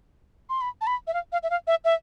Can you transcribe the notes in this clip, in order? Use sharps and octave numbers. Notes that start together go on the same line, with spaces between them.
C6
B5
A5
B5
E5
F5
F5
E5
F5
E5
E5